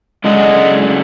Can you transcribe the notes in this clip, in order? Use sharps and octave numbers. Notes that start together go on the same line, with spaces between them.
C#3 F#3 G#3 A3 D4 F#4